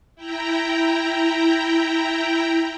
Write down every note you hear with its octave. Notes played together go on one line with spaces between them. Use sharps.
E4 G5 A#5